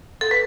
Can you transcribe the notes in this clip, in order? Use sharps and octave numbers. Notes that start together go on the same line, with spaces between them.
A4
B4